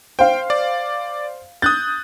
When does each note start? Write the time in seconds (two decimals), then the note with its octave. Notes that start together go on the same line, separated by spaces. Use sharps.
0.19 C5 F5 G5
0.50 D5
1.62 D#6 F#6 G6 A6